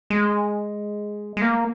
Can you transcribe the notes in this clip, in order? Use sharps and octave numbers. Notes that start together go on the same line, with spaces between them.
G#3
G#3
A#3